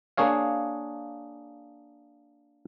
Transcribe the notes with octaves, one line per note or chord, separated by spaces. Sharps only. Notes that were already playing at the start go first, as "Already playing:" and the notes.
A#3 D4 G#4 C#5 F5